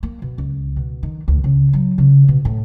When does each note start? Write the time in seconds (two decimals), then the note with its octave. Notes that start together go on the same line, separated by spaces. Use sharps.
0.03 A#3
0.22 B2
0.38 C#2
0.76 B2
1.03 D#3
1.28 D2
1.44 C#3
1.73 F#3
1.98 C#3
2.28 B2
2.45 A2